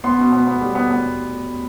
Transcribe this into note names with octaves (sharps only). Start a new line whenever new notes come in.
B3 C6
B2
B3
B3
G3
B3
B3